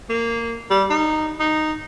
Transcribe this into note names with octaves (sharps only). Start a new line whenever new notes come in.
A#3
G3
D#4
D#4